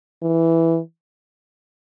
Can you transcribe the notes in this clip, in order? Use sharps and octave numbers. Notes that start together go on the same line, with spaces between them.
E3